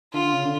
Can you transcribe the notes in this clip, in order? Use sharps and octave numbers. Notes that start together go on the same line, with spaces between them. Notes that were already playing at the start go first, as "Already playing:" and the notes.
D3 F4
C#3
D3